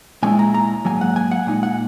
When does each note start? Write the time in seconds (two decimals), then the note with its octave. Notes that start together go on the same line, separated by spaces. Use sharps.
0.23 A#2 G#3 C#4 E4 G#5
0.39 A#5
0.54 A#5
0.85 G#2 F#3 A#3 G#5
1.01 F#5
1.16 G#5
1.32 F#5
1.47 A#2 G#3 D#4 G#5
1.63 F#5